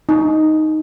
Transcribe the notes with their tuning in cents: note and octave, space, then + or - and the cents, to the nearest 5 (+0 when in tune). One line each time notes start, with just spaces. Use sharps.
D#4 +0